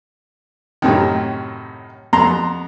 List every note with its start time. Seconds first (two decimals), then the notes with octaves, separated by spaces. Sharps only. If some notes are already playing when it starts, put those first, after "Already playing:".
0.82 F#2 A2 C3 D#3
2.13 F2 B3 A#5 C6